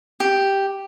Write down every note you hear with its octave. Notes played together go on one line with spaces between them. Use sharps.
G4